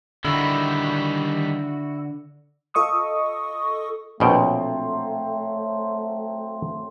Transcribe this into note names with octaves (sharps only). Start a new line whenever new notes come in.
D3 D#3 G3 E4 F#4
F4 A4 D#5 C#6 D#6 E6
A#1 B2 F#3 A3 C4 F4 G5